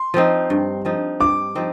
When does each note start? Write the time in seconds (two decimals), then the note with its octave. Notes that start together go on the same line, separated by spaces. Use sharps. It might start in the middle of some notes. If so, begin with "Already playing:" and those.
Already playing: C6
0.14 F3 C4 D#4
0.50 G2
0.85 F3 C4 D#4
1.20 G2 D6
1.55 F3 C4 D#4